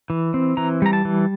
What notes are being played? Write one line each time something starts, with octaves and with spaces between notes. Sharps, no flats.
E3
C4
E3 A#5
G3 A#5
A5
E3